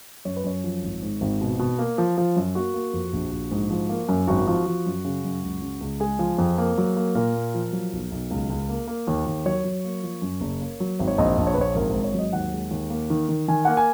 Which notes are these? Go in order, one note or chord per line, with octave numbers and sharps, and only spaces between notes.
F#2 C#5
B4
F#2 C#5
F3
G#1
G#2
G#1
B2
B2
A#3
F3
F3
F#2
A#3 F#4
A#3
F2
A#1
A#1
G#2
F3
A#3
F#2
G#1 F#4
F3
F3
F#2
C#3
F#2
C#2
C#3
C#2
G#3 G#4
F3
F2
A#3
F#3
A#3
A#2 A#4
A#3
F3
F#3
B1
B1
C#2
C#2
A#3
A#3
D#2
D#2
F#3 C#5
F#3
A#3
F3
F#2
F#1
A#3
F#3
G#1
C#5
A#1 D#5
A#1
C#5
B4
A#1 C#5
G#1 A#4
G#2 A#4
C#5
F#3 D#5
D#2 F#5
G#3
D#2
A#3
D#3
D#3
D#3 G#5
A#3 F#5
G#5